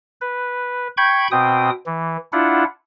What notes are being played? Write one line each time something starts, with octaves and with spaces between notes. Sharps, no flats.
B4
G5 B5 C#6 G6 G#6
B2 C4 G5 D#6
E3
D4 E4 F4 F#5